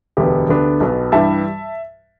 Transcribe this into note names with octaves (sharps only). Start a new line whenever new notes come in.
E1 D2 D3 B3 G4 B4
D2 D3 B3 D4
B1 B2 B3
G2 E3 G3 E5 A5